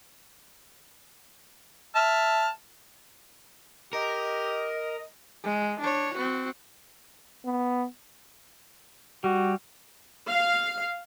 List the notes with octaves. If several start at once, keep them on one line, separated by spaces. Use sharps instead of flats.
E5 A5 F6
G4 A#4 D#5
G#3
D4 C#5
C4 F#4
B3
G3 F#4
F5